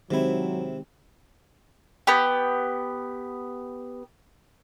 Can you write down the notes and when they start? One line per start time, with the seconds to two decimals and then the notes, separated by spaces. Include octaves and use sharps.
0.11 C3 D#3 F#3 G#3 C4 E4
2.07 B3 G4